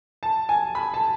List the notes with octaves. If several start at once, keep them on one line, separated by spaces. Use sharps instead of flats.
A5
G#5
B5
A5